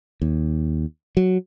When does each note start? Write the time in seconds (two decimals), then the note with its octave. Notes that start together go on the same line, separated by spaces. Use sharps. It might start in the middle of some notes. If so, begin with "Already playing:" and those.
0.22 D#2
1.17 F#3